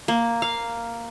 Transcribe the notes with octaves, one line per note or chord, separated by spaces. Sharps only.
A#3
F5